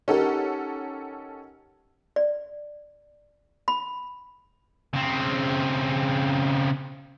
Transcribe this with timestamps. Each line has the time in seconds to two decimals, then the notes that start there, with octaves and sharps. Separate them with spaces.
0.08 C#4 D#4 G4 A4 A#4 F#5
2.16 D5
3.68 B5
4.94 C#3 C4